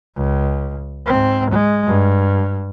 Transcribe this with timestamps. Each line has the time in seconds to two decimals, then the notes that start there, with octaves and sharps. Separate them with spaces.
0.17 C#2
1.06 G#2 C4
1.50 G#3
1.87 G2